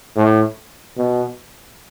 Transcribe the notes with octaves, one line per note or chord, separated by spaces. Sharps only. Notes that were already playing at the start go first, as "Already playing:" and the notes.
A2
B2